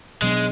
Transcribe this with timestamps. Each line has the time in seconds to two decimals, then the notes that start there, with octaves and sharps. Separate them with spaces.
0.22 B2 F#3 G#3 B3 D4